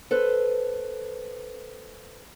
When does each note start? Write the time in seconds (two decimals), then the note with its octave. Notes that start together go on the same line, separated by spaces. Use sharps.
0.11 A4 B4 C5